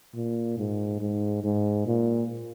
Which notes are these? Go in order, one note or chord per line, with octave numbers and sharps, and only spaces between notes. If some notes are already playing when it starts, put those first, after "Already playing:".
A#2
G#2
G#2
G#2
A#2